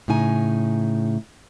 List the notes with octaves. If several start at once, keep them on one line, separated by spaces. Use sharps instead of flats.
A2 C#3 D#4 G#5